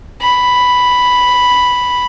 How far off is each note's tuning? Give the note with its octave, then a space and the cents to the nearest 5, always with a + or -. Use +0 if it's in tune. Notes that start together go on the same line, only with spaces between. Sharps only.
B5 +0